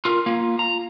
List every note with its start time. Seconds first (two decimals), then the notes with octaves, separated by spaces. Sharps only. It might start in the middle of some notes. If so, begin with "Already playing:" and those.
0.05 F4 A#4
0.26 A#3 F4
0.59 A#5